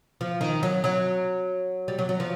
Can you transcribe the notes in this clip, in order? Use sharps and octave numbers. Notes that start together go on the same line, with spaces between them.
F3
D#3
F#3
F#3
G3
F#3
F#3
F3